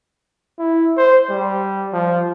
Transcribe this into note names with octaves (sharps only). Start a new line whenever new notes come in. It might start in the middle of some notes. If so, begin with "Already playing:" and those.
E4
C5
G3
F3